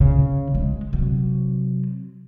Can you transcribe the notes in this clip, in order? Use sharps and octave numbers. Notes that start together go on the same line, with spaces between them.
C#3
G#3
C3 F#3